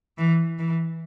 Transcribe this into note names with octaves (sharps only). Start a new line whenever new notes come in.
E3
E3